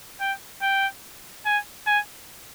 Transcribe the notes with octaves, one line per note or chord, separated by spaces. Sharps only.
G5
G5
G#5
G#5